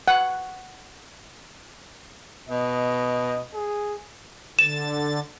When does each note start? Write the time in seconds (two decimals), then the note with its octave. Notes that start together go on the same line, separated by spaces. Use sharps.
0.08 F#5
2.49 B2 D#5
3.54 G#4
4.59 D3 A6 E7